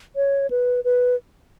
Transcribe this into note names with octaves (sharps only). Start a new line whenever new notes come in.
C#5
B4
B4